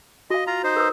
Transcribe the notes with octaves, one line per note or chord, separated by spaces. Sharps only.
F#4 D#5 F5
F4 A#5
D#4 C5
A#4 B4 D#6